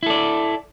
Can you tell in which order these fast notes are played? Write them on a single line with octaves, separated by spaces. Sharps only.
E4 A4 D5